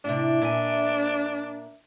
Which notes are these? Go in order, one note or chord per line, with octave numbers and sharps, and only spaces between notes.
A2 C3 D4
A#2 E5 G#5